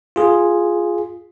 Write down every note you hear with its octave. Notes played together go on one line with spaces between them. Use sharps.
F4 G#4